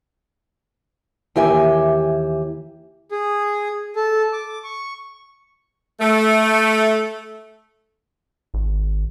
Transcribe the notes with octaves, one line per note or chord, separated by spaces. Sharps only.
D#2 E3 G4 E5 G#5
G#4
A4
D6
C#6
A3
G#1